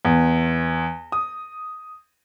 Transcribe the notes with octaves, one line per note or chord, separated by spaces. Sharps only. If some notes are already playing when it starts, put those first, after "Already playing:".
E2
D#6